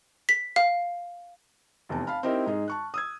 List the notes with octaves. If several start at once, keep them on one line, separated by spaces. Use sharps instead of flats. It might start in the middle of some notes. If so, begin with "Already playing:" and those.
B6
F5
F1 E2 A5
F5 A5 B5 F6
C4 D#4 E4 G4 A#4 C5
G#2 D#4 G#4
A5 C#6 F#6
D#6 E6 G#6